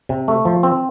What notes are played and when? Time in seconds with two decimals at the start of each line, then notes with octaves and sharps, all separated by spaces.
0.09 C3
0.28 A3
0.45 F3
0.63 C4